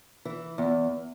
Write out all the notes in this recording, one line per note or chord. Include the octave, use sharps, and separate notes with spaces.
E3
E2